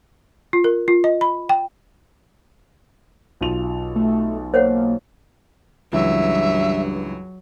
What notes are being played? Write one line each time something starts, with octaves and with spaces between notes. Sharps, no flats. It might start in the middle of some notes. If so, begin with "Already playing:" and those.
F4
A#4
F4
D#5
B5
G5
B1 F4 F7
A3
A#3 C5 C#5 F#5
C#2 G2 E3 F#3 E5